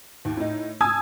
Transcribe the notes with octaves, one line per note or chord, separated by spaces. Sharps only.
D#2
A2 D#4
G#5 A5 D#6 E6 G#6